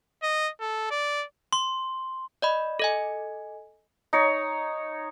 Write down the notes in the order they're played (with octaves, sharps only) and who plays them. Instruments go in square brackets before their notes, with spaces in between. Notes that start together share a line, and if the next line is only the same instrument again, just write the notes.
[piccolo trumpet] D#5
A4
D5
[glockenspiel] C6
[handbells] D5 D#5 B5
A4 D#5 G#5
[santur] D#4 C#5